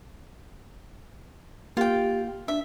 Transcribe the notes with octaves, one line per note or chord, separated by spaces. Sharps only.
A#3 F4 G4 G5
D4 E5